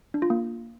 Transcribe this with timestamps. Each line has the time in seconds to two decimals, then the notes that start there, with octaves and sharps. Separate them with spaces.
0.14 D4
0.22 F4
0.30 A#3